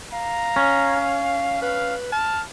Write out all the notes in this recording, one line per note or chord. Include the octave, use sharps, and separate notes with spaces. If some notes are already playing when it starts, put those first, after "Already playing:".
F5 A#5
C#4
B4 F5
A5 F6